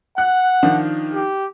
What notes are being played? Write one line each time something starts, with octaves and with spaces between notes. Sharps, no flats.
F#5 F#6
D#3 F3 D4
G4